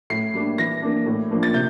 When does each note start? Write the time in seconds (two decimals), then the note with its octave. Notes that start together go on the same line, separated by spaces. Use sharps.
0.10 A2 C7
0.34 G3 A#3 D4
0.58 E3 A#6
0.82 A#3 D4
1.06 A2
1.31 F3 A#3 D4
1.43 A6
1.54 C3 G6